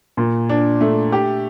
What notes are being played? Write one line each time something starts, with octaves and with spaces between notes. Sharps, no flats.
A#2
D4
A3
G4